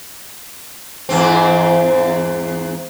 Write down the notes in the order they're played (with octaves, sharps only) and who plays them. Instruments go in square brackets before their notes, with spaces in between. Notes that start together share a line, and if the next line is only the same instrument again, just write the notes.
[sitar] E2 G#2 C4